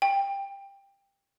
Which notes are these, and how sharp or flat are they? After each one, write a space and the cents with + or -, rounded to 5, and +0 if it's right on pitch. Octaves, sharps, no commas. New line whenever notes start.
G5 +15